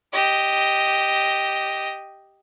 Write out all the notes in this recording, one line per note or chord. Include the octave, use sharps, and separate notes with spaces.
G4 D#5